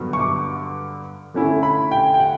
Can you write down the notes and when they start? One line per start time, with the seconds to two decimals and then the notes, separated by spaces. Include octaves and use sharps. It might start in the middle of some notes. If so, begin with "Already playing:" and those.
Already playing: G2 D3 F#3 B3
0.13 C#6
0.20 D6
1.34 D3 A3 C#4 E4
1.63 B5
1.91 G5
2.14 G5
2.20 F#5